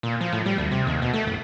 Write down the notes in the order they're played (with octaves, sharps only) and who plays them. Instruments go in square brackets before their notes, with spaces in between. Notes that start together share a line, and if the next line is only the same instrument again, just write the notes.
[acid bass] A#2
F3
A2
G3
D2
C3
D#2
B2
A3
F#1